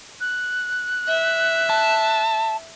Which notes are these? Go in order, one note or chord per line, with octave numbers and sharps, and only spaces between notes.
F#6
E5
A5